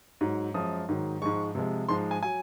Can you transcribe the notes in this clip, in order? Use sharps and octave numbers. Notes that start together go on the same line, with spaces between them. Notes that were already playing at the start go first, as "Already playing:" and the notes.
G#2 F#3
F#2 F3 G#3 D#6
G#2 D#3 F#3
G#2 F3 G#3 C#6
C3 F3 G#3
G#2 F3 G#3 C6
G#5
F#3 G#5